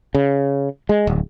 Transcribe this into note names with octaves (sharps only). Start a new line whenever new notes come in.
C#3
G#3
D1